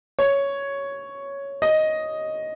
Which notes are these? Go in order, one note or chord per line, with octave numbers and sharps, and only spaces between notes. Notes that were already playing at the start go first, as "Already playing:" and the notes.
C#5
D#5